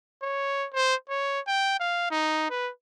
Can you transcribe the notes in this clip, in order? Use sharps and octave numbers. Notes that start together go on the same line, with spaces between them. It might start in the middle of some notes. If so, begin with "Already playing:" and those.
C#5
C5
C#5
G5
F5
D#4
B4